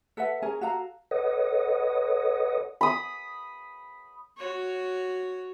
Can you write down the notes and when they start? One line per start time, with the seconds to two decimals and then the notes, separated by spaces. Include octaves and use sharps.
0.17 A4 B4 E5 F#5
0.42 C#4 G#4 A#4 G#5
0.61 F#4 A4 F5 A#5
1.11 A4 B4 C#5 D#5 F#5 D#6
2.81 B5 D#6
4.38 F#4 C#5